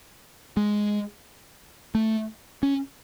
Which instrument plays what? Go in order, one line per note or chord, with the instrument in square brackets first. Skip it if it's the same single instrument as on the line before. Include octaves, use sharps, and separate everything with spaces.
[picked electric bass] G#3
A3
C#4